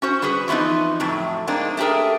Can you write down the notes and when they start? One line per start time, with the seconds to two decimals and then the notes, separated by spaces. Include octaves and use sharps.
0.02 C#4 F#4 C5
0.22 G3 F#4 G#4 B4
0.48 E3 F3 B3 C4 D#4
1.00 F2 A2 F#3
1.47 G#3 A#3 C4 D4 D#4
1.77 A3 C4 G4 G#4 A#4